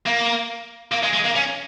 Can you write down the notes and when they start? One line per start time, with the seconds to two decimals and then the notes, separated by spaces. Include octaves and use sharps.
0.06 A#3
0.92 A#3
1.03 G#3
1.13 G#3
1.24 A#3
1.35 C#4